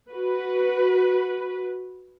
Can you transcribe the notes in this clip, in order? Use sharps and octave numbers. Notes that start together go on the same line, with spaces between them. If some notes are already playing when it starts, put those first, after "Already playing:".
F#4 B4